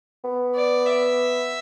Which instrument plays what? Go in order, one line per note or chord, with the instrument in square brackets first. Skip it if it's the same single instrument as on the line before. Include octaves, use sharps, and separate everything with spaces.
[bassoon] B3
[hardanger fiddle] D5
E5